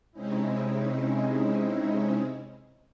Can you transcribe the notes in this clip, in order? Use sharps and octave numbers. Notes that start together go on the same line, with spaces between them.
C3 G#3 C4 C#4 D#4 E4